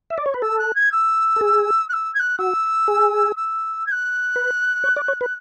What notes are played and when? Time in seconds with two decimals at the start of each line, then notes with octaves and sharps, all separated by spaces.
0.10 E5
0.18 D5
0.26 C#5
0.34 B4
0.42 A4 E6
0.58 F#6
0.75 G#6
0.92 E6
1.36 A4
1.41 G#4
1.89 F#6
1.93 E6
2.14 G#6
2.19 F#6
2.38 F#4 E6
2.88 G#4
3.36 E6
3.86 G#6
3.91 F#6
4.36 B4
4.84 C#5
4.96 D5
5.08 C#5
5.21 B4